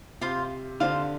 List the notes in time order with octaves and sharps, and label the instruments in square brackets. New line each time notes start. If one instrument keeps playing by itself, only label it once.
[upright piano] C3 [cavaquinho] F4 C5 F5 C6
[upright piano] D3 [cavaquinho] F4 C5 F5 C6